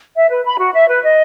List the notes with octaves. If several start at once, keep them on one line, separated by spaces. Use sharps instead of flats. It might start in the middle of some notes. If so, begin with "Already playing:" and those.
E5
B4
B5
F#4
E5
B4
D#5